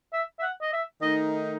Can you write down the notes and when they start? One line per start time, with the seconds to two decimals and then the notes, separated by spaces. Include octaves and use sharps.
0.13 E5
0.39 E5
0.42 F#5
0.61 D#5
0.73 E5
1.02 D#3 A3 D#4 D#5